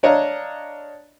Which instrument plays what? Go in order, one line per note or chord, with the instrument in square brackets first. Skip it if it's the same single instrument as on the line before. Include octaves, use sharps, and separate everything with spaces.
[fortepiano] D4 C#5 D#5 F5 A#5